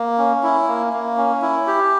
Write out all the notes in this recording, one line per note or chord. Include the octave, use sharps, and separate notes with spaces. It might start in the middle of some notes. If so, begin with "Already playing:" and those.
Already playing: A#3
C#4
E4
A#3
A#3
C#4
E4
G4